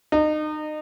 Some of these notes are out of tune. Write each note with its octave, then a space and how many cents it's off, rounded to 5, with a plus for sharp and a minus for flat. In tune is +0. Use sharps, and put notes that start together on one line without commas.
D#4 -30